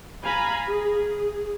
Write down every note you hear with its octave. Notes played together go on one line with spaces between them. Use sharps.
F5 G#5 A#5 B5
G#4